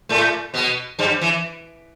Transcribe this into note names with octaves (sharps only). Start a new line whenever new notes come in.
A2 A3
B2 B3
G2 G3
E3